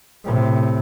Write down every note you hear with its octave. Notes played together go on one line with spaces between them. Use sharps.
A2 C3